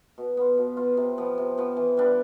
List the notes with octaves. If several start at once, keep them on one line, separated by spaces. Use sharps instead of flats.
B2
B3 F4
B2
B3 F4
C3
F3 B3
C3
F3 B3
E3
G3 B3 D4